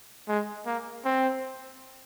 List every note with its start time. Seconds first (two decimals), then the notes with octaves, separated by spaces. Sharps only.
0.28 G#3
0.66 A#3
1.05 C4